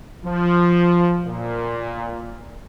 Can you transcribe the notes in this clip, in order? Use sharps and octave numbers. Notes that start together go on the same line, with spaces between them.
F3
A#2